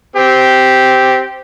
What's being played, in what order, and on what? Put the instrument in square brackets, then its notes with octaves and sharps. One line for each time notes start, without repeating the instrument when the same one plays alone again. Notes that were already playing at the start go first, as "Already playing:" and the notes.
[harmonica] C4 G4